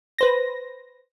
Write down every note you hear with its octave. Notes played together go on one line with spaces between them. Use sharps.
B4 C5 A#6